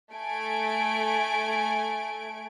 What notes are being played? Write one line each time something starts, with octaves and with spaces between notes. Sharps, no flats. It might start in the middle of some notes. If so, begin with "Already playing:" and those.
A3 G#5 D7